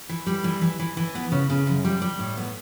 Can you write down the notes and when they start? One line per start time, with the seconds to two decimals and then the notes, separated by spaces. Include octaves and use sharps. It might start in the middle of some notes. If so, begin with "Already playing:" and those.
0.09 E3
0.26 G3
0.44 E3
0.61 E3
0.79 E3
0.97 E3
1.15 B3
1.32 C#3
1.50 C#3
1.67 F#2
1.85 G3
2.02 G3
2.19 A2
2.37 B3